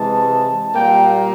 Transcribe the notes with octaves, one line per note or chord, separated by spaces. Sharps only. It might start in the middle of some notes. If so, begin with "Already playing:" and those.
Already playing: C3 E3 G#3 A5
A#2 G3 A#3 G5